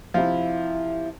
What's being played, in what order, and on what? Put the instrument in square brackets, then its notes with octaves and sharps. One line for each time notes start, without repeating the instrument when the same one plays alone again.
[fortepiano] C3 F3 [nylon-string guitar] E4 E5 F5